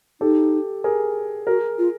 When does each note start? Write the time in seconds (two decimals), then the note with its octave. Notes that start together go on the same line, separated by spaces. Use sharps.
0.21 D#4 G4 A4
0.84 G#4 A#4
1.47 F#4 G#4 A#4
1.78 F4